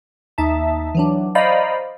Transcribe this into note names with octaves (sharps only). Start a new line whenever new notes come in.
D#2 D#4 E5 A5
E3 F#3 D4
C5 D5 D#5 F5 A#5 B5